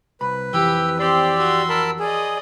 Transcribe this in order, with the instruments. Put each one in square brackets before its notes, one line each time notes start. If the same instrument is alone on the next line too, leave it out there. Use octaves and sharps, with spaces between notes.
[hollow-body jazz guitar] C2 B5 [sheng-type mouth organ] B4
[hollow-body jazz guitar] F2 E3 [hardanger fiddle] G4 [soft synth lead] E6
[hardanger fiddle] C4 C6 [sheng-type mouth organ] G4 D5
[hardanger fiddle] F#4 C6
[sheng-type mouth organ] A#4 A5 B5
[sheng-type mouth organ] G#4 [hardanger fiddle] D5 D#5